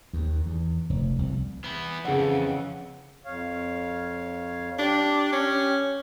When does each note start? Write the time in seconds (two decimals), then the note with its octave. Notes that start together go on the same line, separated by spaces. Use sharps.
0.13 D#2
0.46 E2
0.90 F1
1.18 C2
1.64 B3 E4
2.05 F2 C#3 E3 G#4 F#5
3.25 F2 C#5 F5
4.78 D4 G4
5.32 C#4